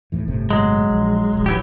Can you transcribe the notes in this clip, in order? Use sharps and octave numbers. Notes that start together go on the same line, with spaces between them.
D#2 A2 E3
G1 A2 C3
F#3 G#3
A#1
D#1 A#1
E3 F#3 G4